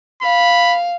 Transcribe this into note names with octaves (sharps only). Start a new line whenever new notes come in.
F5 B5